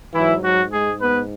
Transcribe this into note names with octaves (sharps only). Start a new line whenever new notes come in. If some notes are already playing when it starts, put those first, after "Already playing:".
G#2 E3 F#3 E4
F#3 F#4
G#3 G#4
B3 B4